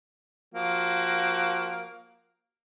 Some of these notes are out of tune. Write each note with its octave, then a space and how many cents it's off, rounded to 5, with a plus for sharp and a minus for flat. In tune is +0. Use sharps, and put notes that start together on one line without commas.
F3 +15 A#3 +5 F#4 +25